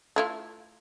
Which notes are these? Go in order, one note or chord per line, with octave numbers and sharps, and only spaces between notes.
A3 E4 F4